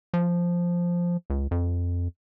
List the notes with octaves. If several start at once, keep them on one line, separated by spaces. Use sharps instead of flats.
F3
C#2
F2